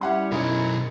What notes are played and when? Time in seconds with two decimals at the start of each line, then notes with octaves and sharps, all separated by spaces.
0.01 G3 C#4 E4 G4 F#5 C6
0.32 B1 F#2 D#4 E4 A#4 C#5